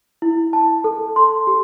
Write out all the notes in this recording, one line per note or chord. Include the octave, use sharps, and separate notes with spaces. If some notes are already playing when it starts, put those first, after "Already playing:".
E4
A5
A4
C6
G4